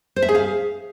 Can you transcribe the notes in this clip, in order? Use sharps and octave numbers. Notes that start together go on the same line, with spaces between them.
C5
E5
G#4
F5